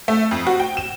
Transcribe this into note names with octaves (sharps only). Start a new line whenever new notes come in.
A3
F2
F#4
G5
E7